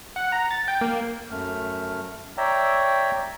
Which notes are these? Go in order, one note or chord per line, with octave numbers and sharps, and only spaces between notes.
F#5
A#5
A6
G5
A#3
F#2 A3 F6
C#5 D5 E5 G5 A#5 E6